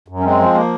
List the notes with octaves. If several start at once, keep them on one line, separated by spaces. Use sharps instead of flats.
F#2
C#4
G#3 C4
F3
A#3